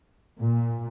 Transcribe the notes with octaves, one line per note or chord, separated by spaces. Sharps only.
A#2